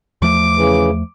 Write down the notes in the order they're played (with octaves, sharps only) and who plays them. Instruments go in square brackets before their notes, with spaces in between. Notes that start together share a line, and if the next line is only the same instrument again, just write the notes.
[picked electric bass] E2 F3 A3 [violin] D6
[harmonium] C#3 E3